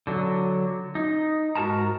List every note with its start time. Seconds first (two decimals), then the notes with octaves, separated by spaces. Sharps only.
0.07 D3 F#3
0.95 D#4
1.55 G#2 F#4 A#4 A5 A#5